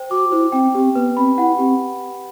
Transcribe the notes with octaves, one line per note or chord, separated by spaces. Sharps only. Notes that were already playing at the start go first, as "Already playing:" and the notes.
Already playing: C5 G5
F#4 D6
E4 C5
C4 G5
C4 G4
B3 B4
C4 B5
E4 F#5
C4 G4